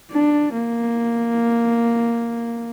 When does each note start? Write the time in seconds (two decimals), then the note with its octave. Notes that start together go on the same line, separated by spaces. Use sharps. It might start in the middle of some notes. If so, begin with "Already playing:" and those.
0.11 D4
0.54 A#3